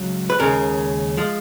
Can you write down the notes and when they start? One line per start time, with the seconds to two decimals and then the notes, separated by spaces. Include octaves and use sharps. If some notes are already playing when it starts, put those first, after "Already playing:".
Already playing: C#2 F#3
0.30 B4
0.39 D#2 C#3 G#3 A#4
1.17 F3 G#3